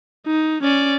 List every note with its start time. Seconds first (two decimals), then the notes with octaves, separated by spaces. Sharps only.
0.27 D#4
0.63 C#4 D5